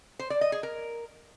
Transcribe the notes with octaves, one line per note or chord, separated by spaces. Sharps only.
C5
D5
D#5
G#4
A#4